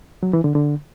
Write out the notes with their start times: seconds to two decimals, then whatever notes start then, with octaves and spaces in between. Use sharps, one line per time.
0.23 F#3
0.33 E3
0.44 D3
0.55 D3